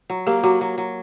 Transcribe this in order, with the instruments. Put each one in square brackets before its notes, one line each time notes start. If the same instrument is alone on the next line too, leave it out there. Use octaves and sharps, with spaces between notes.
[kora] F#3
[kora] A#3 [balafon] G4
[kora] F#3 [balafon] F#4
[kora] F#3
F#3